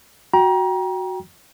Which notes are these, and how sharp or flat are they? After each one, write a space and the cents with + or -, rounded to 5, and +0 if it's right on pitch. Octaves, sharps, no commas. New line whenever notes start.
F#4 +0 G5 +0 A#5 +30